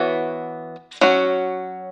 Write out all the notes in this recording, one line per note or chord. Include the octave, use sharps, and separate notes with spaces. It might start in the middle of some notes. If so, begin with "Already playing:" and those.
Already playing: E3 B3 F#4 C#5
F#3 C#4 F#4